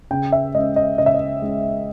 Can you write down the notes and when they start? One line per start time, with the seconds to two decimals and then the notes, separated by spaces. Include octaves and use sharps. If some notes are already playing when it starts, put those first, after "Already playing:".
0.11 C#3 G5
0.32 E5
0.54 G#3 C#4 D#5
0.76 D#5
0.98 C#3 D#5
1.06 E5
1.14 D#5
1.42 G#3 C#4